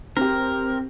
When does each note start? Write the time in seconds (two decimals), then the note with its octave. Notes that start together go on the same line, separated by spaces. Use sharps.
0.17 C4 G4 A#4